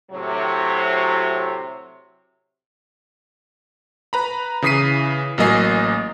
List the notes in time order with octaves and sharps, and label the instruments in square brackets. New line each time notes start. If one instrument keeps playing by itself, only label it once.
[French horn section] A2 C3 F#3
[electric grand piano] B4 A#5 B5
C#3 E3 D#6 B6 C7 D#7
A1 F#3 A#3 D#5 G#5 C7